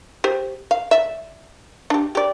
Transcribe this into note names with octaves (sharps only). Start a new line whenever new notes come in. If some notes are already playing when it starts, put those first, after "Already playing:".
G4 C5
F5
D5 E5
D4 G4
G4 D5